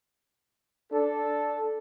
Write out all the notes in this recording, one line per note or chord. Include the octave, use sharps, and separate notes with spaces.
D4 A4